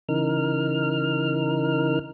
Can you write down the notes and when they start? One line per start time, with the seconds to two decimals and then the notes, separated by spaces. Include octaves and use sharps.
0.09 C#3 E3 D#4 A#4 F6